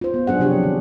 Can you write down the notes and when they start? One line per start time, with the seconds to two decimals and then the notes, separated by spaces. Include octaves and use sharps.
0.01 F4 C5
0.14 B3
0.27 F#3 D4 G#4 F#5
0.40 C3 F3 D4 G4 C#5
0.63 D#3